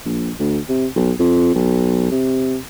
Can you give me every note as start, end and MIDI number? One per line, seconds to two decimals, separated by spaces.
0.05 0.31 34
0.39 0.59 38
0.69 0.86 48
0.96 1.12 35
1.19 1.53 41
1.55 2.08 35
2.11 2.58 48